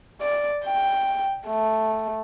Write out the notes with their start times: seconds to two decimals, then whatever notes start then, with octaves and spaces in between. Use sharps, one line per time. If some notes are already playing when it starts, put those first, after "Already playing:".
0.21 D5
0.65 G5
1.47 A3